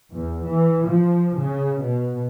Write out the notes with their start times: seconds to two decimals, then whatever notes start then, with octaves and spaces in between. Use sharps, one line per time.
0.12 E2
0.47 E3
0.86 F3
1.37 C#3
1.80 B2